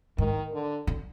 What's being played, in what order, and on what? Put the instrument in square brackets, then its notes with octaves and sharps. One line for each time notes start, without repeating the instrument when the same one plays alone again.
[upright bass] G#2 [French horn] D#3
[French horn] D3
[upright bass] D3